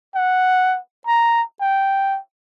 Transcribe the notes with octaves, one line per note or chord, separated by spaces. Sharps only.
F#5
A#5
G5